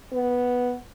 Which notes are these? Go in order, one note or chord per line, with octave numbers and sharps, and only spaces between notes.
B3